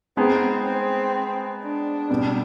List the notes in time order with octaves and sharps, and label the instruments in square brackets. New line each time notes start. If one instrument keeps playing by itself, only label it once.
[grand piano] G#3 B3 D#4 G#4 [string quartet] C4
[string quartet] C4
D4
[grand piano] B2 G3 B3